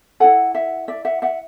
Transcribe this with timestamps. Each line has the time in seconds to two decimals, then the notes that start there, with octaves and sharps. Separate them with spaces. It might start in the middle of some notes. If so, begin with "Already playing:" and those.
0.20 E4 A4 F#5 G#5
0.55 E5 F#5
0.88 D5 E5
1.05 E5 F#5
1.22 E5 F#5